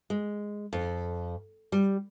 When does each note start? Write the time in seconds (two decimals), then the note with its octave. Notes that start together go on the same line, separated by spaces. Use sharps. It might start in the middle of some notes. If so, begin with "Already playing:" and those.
0.10 G#3
0.73 F2
1.72 G3